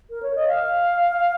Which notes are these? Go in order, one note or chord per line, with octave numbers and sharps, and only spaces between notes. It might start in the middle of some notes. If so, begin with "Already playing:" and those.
A#4
C#5
D#5
F5